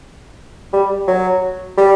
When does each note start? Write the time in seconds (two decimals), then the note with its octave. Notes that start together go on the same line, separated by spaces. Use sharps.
0.73 G3
1.07 F#3
1.77 G3